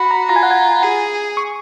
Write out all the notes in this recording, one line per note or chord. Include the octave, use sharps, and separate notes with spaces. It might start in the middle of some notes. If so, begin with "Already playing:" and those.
Already playing: F#4 B5
A#5
F4 A#5
G#5
F#5
G#5
G#4
C#6